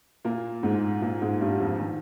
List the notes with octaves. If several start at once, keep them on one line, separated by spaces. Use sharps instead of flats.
A#2 A#3
G#2 G#3
A#2 A#3
G#2 G#3
G2 G3
F2 F3
D#3